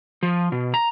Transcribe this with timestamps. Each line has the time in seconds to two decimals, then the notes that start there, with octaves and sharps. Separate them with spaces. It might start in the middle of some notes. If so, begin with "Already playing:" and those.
0.23 F3
0.52 B2
0.74 A#5